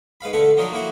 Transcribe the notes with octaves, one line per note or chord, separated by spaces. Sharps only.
G#2 B4 F5 B5
D3 A3 A4 F#5 C#6
F3 F#3 D4 D#4 F#4 A#4
A#3 E4 F#4 F#5